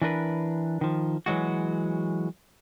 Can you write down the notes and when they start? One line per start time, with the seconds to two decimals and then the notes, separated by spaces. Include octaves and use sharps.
0.02 E3 D4 A#4 B4
0.81 D#3 F3
1.26 E3 F#3 G#3 F#4